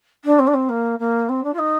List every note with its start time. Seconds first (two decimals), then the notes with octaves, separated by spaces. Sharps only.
0.24 D4
0.39 C4
0.47 D4
0.54 C4
0.69 A#3
0.99 A#3
1.29 C4
1.43 D4
1.53 F4
1.58 D#4